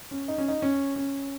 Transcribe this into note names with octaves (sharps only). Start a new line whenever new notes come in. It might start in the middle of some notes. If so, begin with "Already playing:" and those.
C#4
D#4
C#4
D#4
C#4
C#4